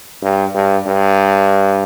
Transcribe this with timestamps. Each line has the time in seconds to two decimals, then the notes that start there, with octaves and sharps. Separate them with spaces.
0.23 G2
0.55 G2
0.86 G2